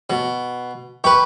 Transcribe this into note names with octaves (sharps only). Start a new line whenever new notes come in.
B2
G4 B4 C#6